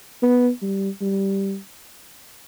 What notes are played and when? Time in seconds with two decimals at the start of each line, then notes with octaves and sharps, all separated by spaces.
0.22 B3
0.62 G3
1.01 G3